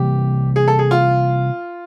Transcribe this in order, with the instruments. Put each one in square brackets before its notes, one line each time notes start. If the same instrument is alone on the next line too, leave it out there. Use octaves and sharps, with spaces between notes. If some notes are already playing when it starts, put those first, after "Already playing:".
Already playing: [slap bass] C3 E3 G3 A#3 [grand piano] G4
[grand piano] G#4
A4
G#4
F4